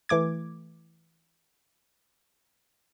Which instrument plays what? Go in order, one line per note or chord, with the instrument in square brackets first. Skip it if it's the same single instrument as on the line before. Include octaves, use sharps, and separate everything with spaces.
[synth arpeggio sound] E3 A3 D6 G#6